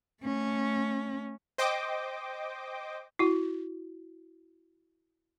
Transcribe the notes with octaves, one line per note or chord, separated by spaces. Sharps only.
A3 C#4
C5 D#5 G5 D6
E4 F#4